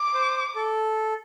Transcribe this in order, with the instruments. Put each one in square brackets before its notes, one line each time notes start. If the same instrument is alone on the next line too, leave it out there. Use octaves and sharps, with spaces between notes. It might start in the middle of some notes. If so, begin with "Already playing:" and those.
Already playing: [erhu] D6
[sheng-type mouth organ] C5
A4